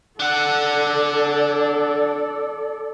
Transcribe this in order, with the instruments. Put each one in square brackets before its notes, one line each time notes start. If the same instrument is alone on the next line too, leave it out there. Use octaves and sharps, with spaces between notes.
[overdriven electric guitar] D4 F#5 [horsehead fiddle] A4 D5